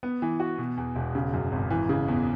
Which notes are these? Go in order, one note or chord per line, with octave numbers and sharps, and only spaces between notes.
B3
E3
F#4
B2
E2
E1
C#3
F#2
G#1
E3
C#3
E2